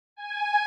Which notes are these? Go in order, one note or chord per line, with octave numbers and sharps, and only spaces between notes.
G#5